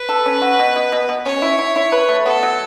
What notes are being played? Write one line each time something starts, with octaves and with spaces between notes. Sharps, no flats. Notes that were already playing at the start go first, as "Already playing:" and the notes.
Already playing: B4
A4
C#4
F#4
B2
B2
B2
B2
C#4 C#5
E4
E4
E4
B4
A3
B3 A4
F#3